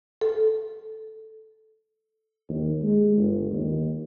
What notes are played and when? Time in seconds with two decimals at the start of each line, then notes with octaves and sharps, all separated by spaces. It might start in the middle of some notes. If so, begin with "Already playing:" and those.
0.21 A4
2.49 D#2
2.82 G#3
3.17 G1
3.52 D#2